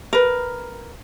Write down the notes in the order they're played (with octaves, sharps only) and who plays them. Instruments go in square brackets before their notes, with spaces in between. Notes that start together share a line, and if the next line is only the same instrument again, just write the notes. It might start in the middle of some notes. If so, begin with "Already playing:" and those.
[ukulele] A#4 B4